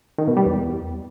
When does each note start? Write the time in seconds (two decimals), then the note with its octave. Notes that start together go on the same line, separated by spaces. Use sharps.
0.18 D#3
0.28 B2
0.37 G3
0.46 E2